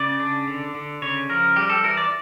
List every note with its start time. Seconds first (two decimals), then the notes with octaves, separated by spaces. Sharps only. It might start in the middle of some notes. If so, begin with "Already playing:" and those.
Already playing: C#3 D5
0.20 D4
0.48 D3
0.75 D3
1.02 C#3 C#5
1.29 F3 A#4
1.56 G3 G4
1.70 A4
1.84 E3 A#4
1.97 D5